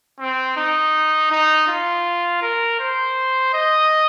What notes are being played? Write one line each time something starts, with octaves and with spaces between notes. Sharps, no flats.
C4
D#4
D#4
F4
A#4
C5
D#5